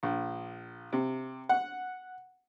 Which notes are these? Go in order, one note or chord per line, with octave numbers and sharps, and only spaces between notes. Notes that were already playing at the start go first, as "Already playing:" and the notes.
A#1
C3
F#5